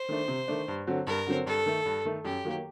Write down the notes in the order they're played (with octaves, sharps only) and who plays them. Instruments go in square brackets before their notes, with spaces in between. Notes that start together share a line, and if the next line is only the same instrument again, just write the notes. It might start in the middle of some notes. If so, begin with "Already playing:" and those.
Already playing: [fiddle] C5
[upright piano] D#3 A3 D4
C3
D#3 A3 D4
G2
D3 F#3 C4
[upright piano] G2 [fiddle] A#4
[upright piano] D3 F#3 C4
[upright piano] G2 [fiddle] A4
[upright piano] D#3 A3
G2
D#3 A3
[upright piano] F#2 [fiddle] G4
[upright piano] D#3 F#3 A#3